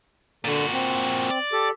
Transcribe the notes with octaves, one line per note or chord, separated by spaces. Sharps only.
A#2 D3 F#4
C4
D5
G4 A4